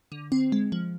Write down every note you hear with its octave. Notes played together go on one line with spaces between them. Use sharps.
D3
C4
G#3
F3